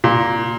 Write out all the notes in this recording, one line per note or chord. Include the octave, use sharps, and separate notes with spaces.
A#2